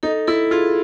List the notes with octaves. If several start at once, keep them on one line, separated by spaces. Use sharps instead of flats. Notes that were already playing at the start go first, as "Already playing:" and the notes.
D#4 A4
E4 A4
F4 G#4